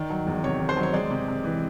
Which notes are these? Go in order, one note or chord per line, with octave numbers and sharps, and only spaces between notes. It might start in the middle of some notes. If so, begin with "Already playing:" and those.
Already playing: D#3 D5
F#3
E2
C3 C#5
D#3
C5
F#3
C#5
G#3 D5
C3
C3
E3